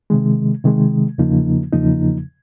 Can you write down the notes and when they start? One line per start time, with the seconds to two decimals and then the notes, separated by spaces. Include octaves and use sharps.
0.10 C3 D#3 G#3
0.64 C3 D#3 G#3
1.18 E2 C#3 F3 A#3 D#4
1.73 E2 C#3 F3 A#3 D#4